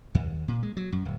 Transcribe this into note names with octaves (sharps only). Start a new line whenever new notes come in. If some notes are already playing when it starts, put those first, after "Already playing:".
D#2
A#2
G#3
F#3
F#2
D1